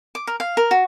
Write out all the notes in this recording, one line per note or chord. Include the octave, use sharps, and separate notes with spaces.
D6
A#4
F5
A#4
F#4